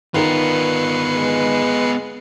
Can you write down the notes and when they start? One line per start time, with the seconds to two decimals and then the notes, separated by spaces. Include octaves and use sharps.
0.14 D#3 B3 F4 A#4 B4 C7 C#7
1.15 G#3